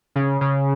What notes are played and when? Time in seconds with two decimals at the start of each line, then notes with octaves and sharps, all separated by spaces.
0.16 C#3
0.41 C#3